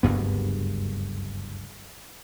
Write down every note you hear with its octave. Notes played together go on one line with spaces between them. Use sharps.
F#1 D2 G2 B3